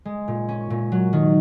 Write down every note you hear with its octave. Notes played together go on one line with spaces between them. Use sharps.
G#3
A#2
C#4
A#2
F#3
D#3